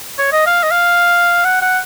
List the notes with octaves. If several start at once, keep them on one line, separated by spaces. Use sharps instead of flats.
C#5
D#5
F5
D#5
F5
F#5
F#5